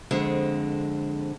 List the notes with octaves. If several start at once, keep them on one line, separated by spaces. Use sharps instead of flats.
F2 D3 G#3 C4